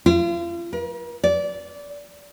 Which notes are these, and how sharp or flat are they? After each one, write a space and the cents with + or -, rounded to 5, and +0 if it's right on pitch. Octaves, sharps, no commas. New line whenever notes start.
F4 -40
A#4 +45
D5 -20